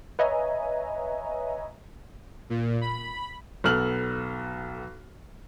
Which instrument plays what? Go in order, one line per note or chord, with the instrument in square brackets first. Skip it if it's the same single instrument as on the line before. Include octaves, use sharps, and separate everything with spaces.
[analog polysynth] B4 C#5 D#5 E5 G#5 A#5
[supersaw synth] A#2
B5
[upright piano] B1 B3 A4 F6 F#7